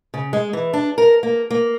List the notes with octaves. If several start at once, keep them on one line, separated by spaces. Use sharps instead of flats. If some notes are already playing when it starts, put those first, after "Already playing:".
C#3
G#3
E3
D4
A#4
A#3
A#3